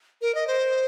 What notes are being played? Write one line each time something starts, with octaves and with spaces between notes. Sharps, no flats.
A#4
D#5
C5